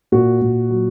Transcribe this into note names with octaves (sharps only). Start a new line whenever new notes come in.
A#2 F#4
A#2
F#3